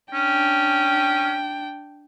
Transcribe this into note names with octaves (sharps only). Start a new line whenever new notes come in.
C#4 D4 G5